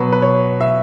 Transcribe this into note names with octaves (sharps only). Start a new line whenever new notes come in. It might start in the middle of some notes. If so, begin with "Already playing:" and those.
Already playing: B2 F#3 B4
B4
C#5
E5